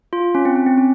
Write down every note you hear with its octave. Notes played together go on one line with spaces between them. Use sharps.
F4
C#4
C4
C#4
C4
C#4